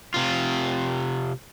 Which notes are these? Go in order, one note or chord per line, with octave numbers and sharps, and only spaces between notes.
C3 F4